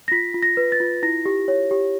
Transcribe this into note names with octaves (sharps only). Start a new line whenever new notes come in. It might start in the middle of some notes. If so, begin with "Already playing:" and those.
A#6
F4 B6
F4
A#6
B4
A6
F4
E4 A#6
G4
C#5
G4